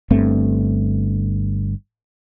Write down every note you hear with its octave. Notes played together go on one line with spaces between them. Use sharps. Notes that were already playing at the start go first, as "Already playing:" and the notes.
G1 G2 A3 C4